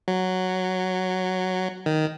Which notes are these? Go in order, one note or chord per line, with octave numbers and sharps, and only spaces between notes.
F#3
D#3